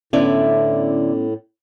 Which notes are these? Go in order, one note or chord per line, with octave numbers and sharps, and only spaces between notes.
A2 D3 B3 C#4 E4 D5